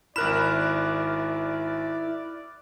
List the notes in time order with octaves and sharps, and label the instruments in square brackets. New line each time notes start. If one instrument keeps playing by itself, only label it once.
[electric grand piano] G#1 A#4 E7 [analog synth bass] E4 [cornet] D5 [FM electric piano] B5 F6 F#6